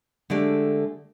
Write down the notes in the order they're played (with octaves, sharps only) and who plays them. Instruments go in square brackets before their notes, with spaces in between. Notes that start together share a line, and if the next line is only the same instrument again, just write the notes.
[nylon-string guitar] D3 G#3 A3 G4 D5